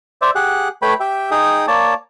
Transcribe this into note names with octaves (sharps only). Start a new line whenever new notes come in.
C5 D5 E5
G4 G#4 F#5 F#6
A3 B4 C#5 G5 B5
G4 E5 G5
D#4 G#4 G5 D#6
A#3 C#5 D5 A5